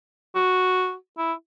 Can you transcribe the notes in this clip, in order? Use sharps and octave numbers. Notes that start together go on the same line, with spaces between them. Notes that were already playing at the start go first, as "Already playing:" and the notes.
F#4
E4